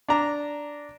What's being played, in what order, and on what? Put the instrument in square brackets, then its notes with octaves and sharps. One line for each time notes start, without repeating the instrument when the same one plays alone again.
[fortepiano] D4 A#5